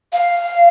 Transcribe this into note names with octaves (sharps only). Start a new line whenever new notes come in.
F5